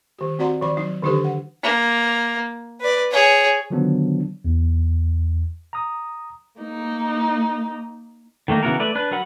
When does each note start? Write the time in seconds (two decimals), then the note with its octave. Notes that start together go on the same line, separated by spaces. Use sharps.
0.19 D#3 G4
0.39 C4 F#4 D5 F#5 A#5 C6
0.61 D#3 F3 B5
0.77 F#3 D#4
1.02 D3 D#3 D4 D#4 G4 A4
1.24 F#5
1.63 A#3
2.80 B4 D5
3.11 G#4 C#5
3.70 D3 D#3 F3 F#3 B3 D4
4.45 E2
5.73 A#5 D#6
6.61 A#3 D#4
8.48 D#3 A3 A#3 D#4
8.63 C#3 E3 B3 F#4 A#4
8.79 A3 B4 D5
8.95 D4 B4
9.11 F#3 A#4 F#5 B5